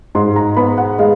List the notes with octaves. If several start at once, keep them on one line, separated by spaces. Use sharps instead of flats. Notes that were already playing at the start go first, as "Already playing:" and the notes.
G#2 C6
A#5
B3 B5
F#5
G#3 F5